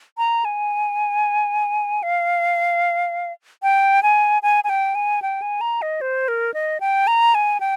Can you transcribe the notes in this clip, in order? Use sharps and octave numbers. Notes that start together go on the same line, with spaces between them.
A#5
G#5
F5
G5
G#5
G#5
G#5
G5
G#5
G5
G#5
A#5
D#5
C5
A#4
D#5
G5
A#5
G#5
G5